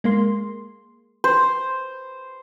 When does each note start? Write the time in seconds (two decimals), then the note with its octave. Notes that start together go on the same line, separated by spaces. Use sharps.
0.04 G#3 A#3 C6
1.24 C5